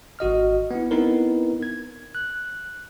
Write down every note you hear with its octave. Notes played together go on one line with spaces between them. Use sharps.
G#1 F#4 D#5 F6
B3 E4
B3 C4 D#4 E4 A#4 B4
G#6
F#6